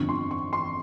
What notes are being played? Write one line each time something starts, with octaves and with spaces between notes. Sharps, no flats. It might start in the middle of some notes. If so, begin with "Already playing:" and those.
Already playing: G1 F2 D3 F3 C#6
C6
C#6
C6